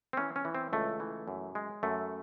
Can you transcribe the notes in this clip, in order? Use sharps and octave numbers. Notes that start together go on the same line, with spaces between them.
C4
E3 C#4
C#4
E3
C4
C#2 A3
E3
F#2
G#3
F#2 A3